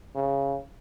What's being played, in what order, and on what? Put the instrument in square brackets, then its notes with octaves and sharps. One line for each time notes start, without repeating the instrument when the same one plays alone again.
[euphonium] C#3